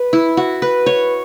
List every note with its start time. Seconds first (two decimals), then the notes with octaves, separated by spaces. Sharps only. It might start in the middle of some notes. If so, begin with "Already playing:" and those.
Already playing: B4
0.13 E4
0.37 F#4
0.62 B4
0.86 C#5